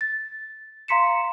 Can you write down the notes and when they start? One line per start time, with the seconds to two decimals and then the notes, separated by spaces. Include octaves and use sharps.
0.01 A6
0.88 F5 A#5 C6 B6 C#7 E7